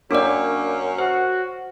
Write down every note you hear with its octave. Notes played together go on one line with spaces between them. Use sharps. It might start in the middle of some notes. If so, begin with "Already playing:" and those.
F#2 A#3 C#4 D4 D5 D6
F#4 C5 C7